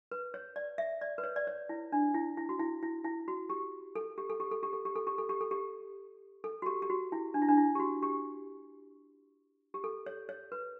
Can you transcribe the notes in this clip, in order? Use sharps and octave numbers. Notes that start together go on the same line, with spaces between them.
B4
C#5
D5
E5
D5
B4
C#5
D5
C#5
E4
D4
E4
E4
F#4
E4
E4
E4
F#4
G4
A4
G4
A4
G4
A4
G4
A4
G4
A4
G4
A4
G4
A4
G4
A4
F#4
G4
G4
F#4
E4
D4
E4
D4
E4
G4
F#4
G4
G4
A4
C#5
C#5
B4